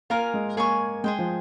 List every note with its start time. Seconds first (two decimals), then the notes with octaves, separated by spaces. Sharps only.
0.10 A#3 F4 A#4 F5 G#5
0.34 G#3
0.57 A#3 G#4 C#5 G#5 C#6
1.04 G#3 G#4 C5 G5
1.19 F3